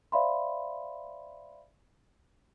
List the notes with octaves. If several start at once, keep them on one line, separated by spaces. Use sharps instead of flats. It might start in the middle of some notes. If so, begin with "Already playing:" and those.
C5 D5 E5 F5 B5 C6